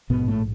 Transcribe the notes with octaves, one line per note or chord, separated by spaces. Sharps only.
A#1 G#2 B2 B3
A2 A3